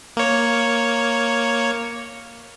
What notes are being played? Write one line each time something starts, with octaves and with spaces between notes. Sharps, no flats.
A#3 C#5